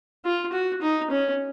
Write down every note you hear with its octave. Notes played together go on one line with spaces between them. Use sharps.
F4
F#4
D#4
C#4